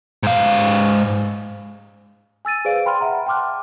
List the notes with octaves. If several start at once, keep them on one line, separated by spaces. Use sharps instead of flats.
G#2 F5
G#5 E6 A6 D#7
G#4 B4 C5 D5 F5 D7
G5 B5 C6 F6
E5 F#5 A#5
G5 A5 C6 D6 F6 F#6